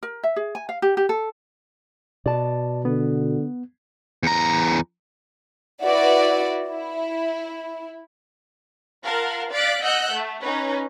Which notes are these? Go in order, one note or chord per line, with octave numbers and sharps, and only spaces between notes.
A#4
E5
G#4
G#5
F5
G4
G4
A4
B2 D5 A5
D3 B3
E2 A#5
E4 F#4 B4 D5 E5
E4
F4 A#4 F5 F#5 A5
D5 F5 F#6 A6 B6 D7
D#5 F#5 E6 F#6 G6 C#7
A3
C#4 D#4 B4 C#5